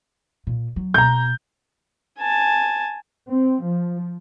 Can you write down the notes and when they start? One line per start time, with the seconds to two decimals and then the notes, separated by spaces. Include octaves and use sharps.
0.47 A#2
0.76 F#3
0.94 B2 A#5 G6
2.18 G#5 A5
3.29 C4
3.64 F3